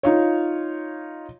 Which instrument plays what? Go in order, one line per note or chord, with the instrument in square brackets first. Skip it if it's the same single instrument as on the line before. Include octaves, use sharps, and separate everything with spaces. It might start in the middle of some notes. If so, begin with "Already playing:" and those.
[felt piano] D#4 F4 C#5